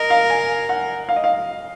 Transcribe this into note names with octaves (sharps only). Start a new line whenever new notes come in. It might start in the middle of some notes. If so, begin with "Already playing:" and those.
Already playing: A#4 D#5
F5
G#5
F#5
F5
D#5
F5